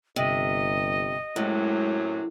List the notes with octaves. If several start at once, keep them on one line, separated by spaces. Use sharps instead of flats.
G1 C3 D#5
F#2 A2 C3 F#3 G#3